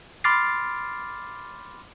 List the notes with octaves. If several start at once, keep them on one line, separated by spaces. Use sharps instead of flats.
B5 C6 D6 F6 A6 C7